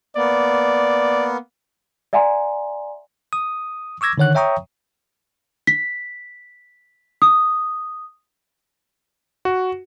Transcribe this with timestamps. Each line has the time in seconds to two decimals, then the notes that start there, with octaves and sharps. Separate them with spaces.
0.16 A#3 B3 D5
2.13 D5 E5 F#5 G#5 A#5 C6
3.33 D#6
4.01 C#6 D6 E6 G#6 A#6
4.18 D3 D#3 C#5 F#5 F#6
4.35 C#5 E5 G5 A#5 C#6 D#6
5.67 B6
7.22 D#6
9.45 F#4